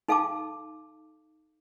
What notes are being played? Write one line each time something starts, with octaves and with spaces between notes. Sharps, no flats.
D#4 A4 F5 G5 A5 D6